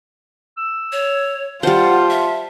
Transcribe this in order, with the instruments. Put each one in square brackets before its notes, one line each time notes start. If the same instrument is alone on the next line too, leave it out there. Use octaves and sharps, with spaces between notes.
[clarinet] E6
[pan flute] C#5
[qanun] G3 C5 [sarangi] F4 [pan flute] F#5 [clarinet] A5
[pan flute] E5